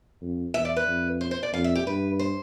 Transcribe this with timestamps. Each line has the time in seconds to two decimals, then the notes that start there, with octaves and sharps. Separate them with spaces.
0.21 F2
0.54 E2 E5
0.65 D5
0.76 B4
0.87 F2
1.21 C5
1.31 C5
1.43 D5
1.53 F2 F5
1.64 E5
1.75 G4
1.86 G2 B4
2.19 C5